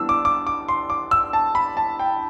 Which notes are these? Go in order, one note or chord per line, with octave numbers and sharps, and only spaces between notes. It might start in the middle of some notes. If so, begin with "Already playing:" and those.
Already playing: E3 G3 B3 D4 E6
D6
D6
D6
C6
D6
E6
A5
B5
A5
G5